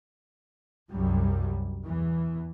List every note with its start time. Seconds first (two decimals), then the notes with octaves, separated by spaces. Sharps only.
0.91 C2 F#2 F#3 G3
1.86 E2 E3